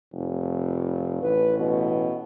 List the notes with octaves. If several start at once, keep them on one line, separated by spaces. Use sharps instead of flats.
F1
A1 B4
B2